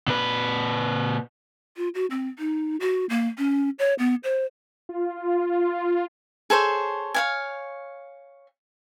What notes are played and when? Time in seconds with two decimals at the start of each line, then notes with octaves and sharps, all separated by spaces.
0.07 A#2 B4
1.77 F4
1.95 F#4
2.10 C4
2.39 D#4
2.80 F#4
3.09 A#3
3.38 C#4
3.79 C#5
3.99 B3
4.24 C5
4.89 F4
6.50 G#4 A4 C5 C#5
7.14 C#5 F5 G#5